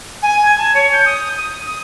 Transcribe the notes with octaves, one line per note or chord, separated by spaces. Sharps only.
G#5
G#6
A5
C#5
G6
D#6
D#6
D#6